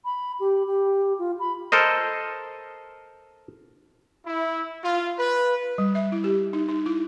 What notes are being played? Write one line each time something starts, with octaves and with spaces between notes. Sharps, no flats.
B5
G4
G4
F4
B5
A4 A#4 C5 D#5
E4
F4
B4
G3
E5
E4
G4
D#4
D#4
E4